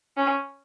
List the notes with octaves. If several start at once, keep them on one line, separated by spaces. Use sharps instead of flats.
C#4